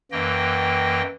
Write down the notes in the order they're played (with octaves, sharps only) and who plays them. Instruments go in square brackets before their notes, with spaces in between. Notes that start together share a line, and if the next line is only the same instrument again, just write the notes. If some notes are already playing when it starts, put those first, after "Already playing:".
[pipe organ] F#2 E3 A#3 D#5 G5